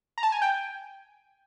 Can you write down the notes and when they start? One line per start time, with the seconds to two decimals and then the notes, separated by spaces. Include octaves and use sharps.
0.18 A#5
0.23 A5
0.32 G#5
0.42 G5